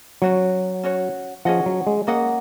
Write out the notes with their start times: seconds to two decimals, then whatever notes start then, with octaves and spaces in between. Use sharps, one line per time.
0.22 F#3 C#4 F#4 C#5
0.83 C#4 F#4 C#5
1.45 F3 C#4 G#4 D#5 F#5
1.66 F#3
1.87 G#3
2.07 A#3 C#4 G#4 D#5 F#5